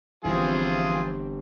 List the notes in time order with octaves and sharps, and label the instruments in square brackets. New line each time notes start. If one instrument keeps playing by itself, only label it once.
[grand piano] G1 [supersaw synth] E3 C4 [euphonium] F3 [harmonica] F4 G#4 G#5